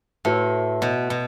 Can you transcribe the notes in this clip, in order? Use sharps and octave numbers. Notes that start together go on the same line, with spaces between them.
A2 F#4 B4 E5 A5
B2
B2